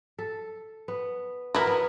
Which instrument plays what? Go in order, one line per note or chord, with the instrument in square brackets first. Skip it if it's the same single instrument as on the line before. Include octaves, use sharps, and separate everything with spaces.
[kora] A4
B3
[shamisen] F#3 E4 [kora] A#4 B4 D#5
[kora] B3